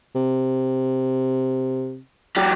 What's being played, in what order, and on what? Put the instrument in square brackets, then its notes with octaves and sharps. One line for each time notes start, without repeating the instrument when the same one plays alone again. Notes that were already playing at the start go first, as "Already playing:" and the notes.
[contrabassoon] C3
[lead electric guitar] F#3 G4